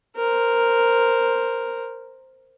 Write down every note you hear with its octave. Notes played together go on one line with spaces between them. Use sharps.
A#4 C5